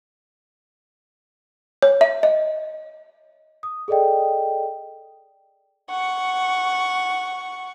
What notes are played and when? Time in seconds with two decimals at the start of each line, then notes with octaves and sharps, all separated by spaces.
1.82 C#5
2.01 E5
2.23 D#5
3.63 D#6
3.88 G#4 A4 D5 D#5 G5
5.90 F#5 C#6